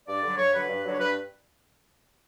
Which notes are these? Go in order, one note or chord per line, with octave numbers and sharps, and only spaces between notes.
G2 D5
D3 F#3
G2 C#5
D3 F#3 B4
G2
D3 F#3
C#5
G2 B4